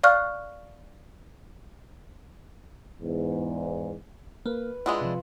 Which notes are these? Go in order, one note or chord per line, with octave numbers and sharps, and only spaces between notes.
D5 F5 C#6 F6 F#6
E2 G#2
A#3 B4
G#3 D4 E4 F4 F#5 D#6
C3 F3